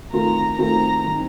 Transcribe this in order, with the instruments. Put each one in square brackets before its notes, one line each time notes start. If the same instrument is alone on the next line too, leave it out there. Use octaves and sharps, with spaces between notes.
[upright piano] D#3 A3 C4 F4 A#4 [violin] A#5
[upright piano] D#3 A3 C4 F4 A#4 [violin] A#5
[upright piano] D#3 G3 C4